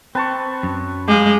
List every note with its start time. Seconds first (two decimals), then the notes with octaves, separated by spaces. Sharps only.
0.15 C4 B4 A5 C#6
0.63 F#2
1.08 G#3 G4 F5